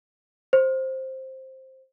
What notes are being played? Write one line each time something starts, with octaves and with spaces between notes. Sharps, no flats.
C5